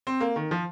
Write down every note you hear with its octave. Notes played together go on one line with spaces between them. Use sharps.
C4
A#3
D#3
F3